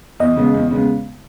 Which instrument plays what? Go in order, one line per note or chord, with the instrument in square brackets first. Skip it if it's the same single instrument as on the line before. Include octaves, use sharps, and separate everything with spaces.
[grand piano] E2 [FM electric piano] D#5
[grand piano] C#3 G#3 B3
E2
C#3 G#3 B3